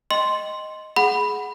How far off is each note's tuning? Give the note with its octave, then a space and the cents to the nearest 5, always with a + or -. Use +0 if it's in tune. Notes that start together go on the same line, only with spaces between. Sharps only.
D#5 +0 G5 +0 C6 +0
G#4 +15 F#5 +0 B5 +0